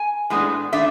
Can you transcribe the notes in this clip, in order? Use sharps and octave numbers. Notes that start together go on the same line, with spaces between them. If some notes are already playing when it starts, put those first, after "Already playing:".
Already playing: G#5
A2 G#3 B3 D4
A3 D4 E5